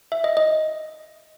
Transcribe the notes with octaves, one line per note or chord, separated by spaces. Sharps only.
E5
D#5
D#5